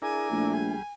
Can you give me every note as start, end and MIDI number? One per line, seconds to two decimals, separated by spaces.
0.02 0.53 62
0.02 0.53 64
0.02 0.30 68
0.02 0.53 70
0.02 0.93 80
0.31 0.74 34
0.31 0.73 57
0.53 0.82 55
0.53 0.82 68